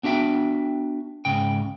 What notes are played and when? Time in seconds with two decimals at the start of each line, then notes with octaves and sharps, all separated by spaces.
0.03 B3 D4 F#4 E5 G5
1.25 C#2 G#2 C#3 G5